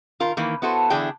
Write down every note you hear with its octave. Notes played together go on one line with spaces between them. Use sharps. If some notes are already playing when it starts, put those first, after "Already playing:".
D#3 F4 A#4
D#3 E3 A#3
B3 E4 F#4 A4 C5
D3 E3 D4 E4 G#4 G5